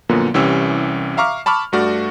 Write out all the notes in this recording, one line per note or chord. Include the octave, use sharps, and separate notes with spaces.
F#2 A#2 D3 F3 A#3 B3
C2 E3 C#4 G4 E6
E5 F5 A#5 C#6 D6 F6
A5 B5 C#6 D6 F6
G2 A3 F#4 D5 F6